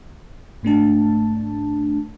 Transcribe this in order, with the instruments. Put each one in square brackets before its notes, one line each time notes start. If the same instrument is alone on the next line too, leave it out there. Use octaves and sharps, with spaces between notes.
[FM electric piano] G#2 A3 D4 A5